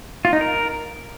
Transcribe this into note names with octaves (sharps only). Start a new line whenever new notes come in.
F4
D#4
A#4